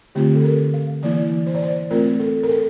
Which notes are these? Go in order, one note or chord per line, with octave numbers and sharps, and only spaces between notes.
D3 A3 C4 F4 G4
A4
A#4
F5
E3 A#3 E4 D5
C5
D5
C5
A3 C4 F4 A#4
A4
A#4
A4